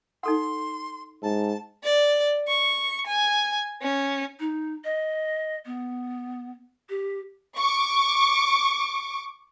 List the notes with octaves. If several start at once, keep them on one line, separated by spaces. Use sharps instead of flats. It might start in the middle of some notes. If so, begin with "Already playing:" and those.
D#4 A4 F#5 C6
G#2 A5
D5
C#6
G#5
C#4
D#4
D#5
B3
G4
C#6 D6